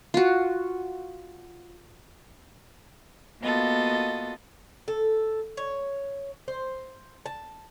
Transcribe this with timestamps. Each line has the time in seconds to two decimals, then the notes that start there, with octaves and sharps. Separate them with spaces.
0.14 F4 F#4
3.42 A#3 B3 F4 F#4 A4 D#5
4.88 A4
5.57 C#5
6.48 C5
7.26 A5